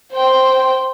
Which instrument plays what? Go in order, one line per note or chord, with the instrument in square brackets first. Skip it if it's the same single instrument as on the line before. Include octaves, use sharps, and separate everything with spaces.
[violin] C5 G5